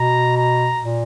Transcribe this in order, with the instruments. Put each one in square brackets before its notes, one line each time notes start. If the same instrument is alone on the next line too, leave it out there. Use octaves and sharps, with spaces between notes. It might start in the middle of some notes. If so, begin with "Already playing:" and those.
Already playing: [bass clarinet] B2 [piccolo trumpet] A#5
[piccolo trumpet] A#5
[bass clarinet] A#2